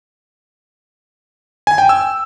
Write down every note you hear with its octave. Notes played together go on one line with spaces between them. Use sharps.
G#5
G5
E6